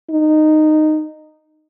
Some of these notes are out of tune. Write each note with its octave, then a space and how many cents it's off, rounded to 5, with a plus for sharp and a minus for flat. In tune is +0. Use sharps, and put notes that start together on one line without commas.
D#4 -15